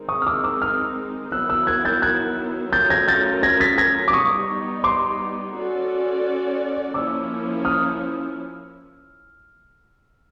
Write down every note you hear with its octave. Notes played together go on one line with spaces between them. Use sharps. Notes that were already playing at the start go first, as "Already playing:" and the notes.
Already playing: D#3 G#3 C4 D#4
C#6 D#6
F6
D6 E6
D6 E6
D#6 F6
D#3 F#3 B3 E4 E6 F#6
E6 F#6
F#6 G#6
G6 A6
F#6 G#6
F#3 A3 C#4 F4 A#4 G6 A6
G#6 A#6
G6 A6
G#6 A#6
A6 B6
G#6 A#6
D6
G3 B3 D#4 C#6 D#6
C6 D6
C#4 F#4 A4 D5
F3 A#3 C#4 E4 D6 E6
D#6 F6